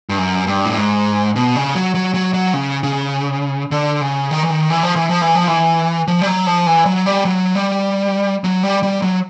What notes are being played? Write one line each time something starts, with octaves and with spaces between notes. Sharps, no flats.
G2
F#2
G2
A2
G#2
B2
C#3
F#3
F#3
F#3
F#3
C#3
C#3
D3
C#3
D#3
E3
D#3
E3
F3
E3
F3
E3
F3
E3
F3
G3
F#3
F3
E3
F#3
G3
F#3
G3
F#3
G3
G3
F#3